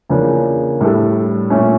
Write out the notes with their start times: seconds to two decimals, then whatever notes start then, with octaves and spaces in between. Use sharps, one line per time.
0.09 E2 C#3 F3 A#3 D4
0.80 A2 G3 D4 A4
1.50 A#2 A3 C#4